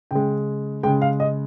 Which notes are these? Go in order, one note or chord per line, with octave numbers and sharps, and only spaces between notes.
C#3 G#3 G5
C#3 G#3 G5
F5
D#5